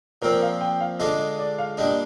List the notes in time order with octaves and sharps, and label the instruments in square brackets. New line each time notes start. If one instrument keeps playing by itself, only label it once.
[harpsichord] A#2 F3 C4 [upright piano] A#4
[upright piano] F5
G5
F5
[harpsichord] D3 G#3 D4 F4 [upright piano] D#5
[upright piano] D#5
D5
F5
[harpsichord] A#2 G3 D4 [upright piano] D#5